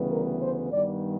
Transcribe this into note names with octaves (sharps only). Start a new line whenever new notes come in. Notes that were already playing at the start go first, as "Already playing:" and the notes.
Already playing: D2 C#3 E3 G3 B3
A#4
C5
G2 D#3 G3 B3 D5